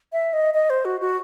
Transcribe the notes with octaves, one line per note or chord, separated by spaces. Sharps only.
E5
D#5
D#5
C5
F#4
F#4